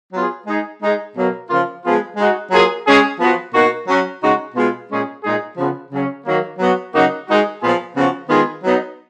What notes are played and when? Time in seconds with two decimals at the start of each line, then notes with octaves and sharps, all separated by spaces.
0.13 F#3 B3 F4 G#4
0.47 G#3 D#4 G#4
0.82 G#3 D#4 G#4
1.16 B2 F#3 A#3
1.49 C#3 F3 A#3 F4
1.83 F3 G#3 B3 F4 G#4
2.17 G#3 D#4 F#4
2.51 F#3 A#3 F4 G#4
2.86 G#3 C#4 G#4
3.20 F3 B3 F#4
3.53 B2 A#3 D#4 F#4
3.88 F#3 C#4 F#4
4.22 C#3 G#3 D#4 F#4
4.55 B2 G#3 B3 F4
4.90 A#2 G#3 C#4 G#4
5.23 A#2 G#3 D#4 G#4
5.57 C#3 F3 B3
5.92 C#3 F#3 C#4
6.25 D#3 F#3 A#3
6.59 F#3 B3 F#4
6.93 C#3 F#3 A#3 D#4 F#4
7.27 G#3 D#4 F#4
7.61 A#2 F3 B3 F4 G#4
7.95 C#3 F3 B3 F#4
8.29 D#3 G#3 B3 F4 G#4
8.64 F#3 B3 D#4